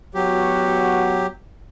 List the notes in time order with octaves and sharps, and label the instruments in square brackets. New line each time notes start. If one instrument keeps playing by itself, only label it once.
[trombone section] A1 B3 F#4 [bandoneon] F#3 G4